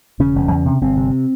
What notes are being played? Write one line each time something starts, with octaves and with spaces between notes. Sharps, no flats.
E1 C#3 C#4
E1
E2
C3
G1 C3 C4
C3